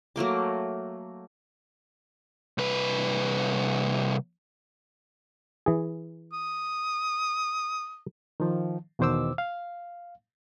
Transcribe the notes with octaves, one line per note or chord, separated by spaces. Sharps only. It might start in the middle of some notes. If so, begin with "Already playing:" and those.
F#3 A3 A#3 D6
C2 B4
E3 G#4
D#6
D#3 F3
E2 B2 D#3 C5 D6 E6
F5